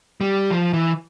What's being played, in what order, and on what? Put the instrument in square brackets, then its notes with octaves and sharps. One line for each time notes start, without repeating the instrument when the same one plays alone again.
[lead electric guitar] G3
F3
E3